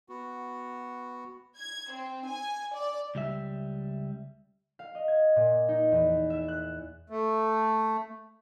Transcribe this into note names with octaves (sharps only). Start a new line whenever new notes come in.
B3 F#4
G#6
C4
G#5
D5
C#2 G3 E5
F5
D#5
G#6
A#2
D#4
E2
E5
F#6
A3